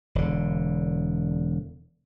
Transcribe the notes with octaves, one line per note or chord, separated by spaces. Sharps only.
E1 D3